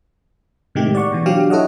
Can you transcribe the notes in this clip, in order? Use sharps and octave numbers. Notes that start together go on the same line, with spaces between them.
A2 C3 D#3 G#3 A3 G4
D5 F#5 C#6
B2 E3
F#3 D4 G4 F5
E4 A4 C#5 D#5 F#5